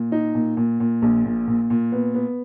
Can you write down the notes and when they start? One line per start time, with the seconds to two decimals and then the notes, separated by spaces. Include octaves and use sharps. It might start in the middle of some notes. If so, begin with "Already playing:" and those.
Already playing: A#2
0.12 D#4
0.35 A#2
0.57 A#2
0.80 A#2
1.02 A#1
1.25 A#2
1.47 A#2
1.70 A#2
1.92 B3
2.15 B3